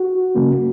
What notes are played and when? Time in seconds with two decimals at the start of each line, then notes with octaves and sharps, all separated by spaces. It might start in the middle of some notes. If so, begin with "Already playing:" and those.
Already playing: F#4
0.35 C#3 F#3 A#3 C#4